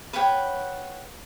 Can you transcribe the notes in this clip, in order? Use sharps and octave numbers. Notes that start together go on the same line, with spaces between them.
B4 C#5 F#5 G5